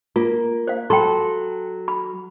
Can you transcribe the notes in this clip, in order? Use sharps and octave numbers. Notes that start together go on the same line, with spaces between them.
A#3 F4
C5 F5
F#3 A4 G5 B5 C6
B5